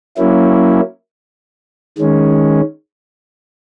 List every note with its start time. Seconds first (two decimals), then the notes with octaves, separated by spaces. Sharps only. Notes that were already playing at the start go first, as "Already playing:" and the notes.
0.17 F#3 A#3 C#4 E4
1.98 D#3 G#3 C#4